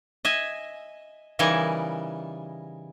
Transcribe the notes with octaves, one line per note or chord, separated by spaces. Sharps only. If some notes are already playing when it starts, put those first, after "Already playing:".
D#5 E5 G#5
C#3 E3 G3 D#4 A#4 G#5